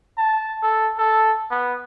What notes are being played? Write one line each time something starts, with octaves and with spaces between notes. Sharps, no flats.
A5
A4
A4
B3